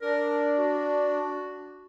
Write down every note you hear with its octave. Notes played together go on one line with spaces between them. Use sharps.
D4 A#4
F#4